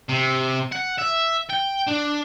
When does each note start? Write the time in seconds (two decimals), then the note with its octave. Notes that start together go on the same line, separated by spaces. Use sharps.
0.09 C3
0.72 F#5
0.98 E5
1.50 G5
1.87 D4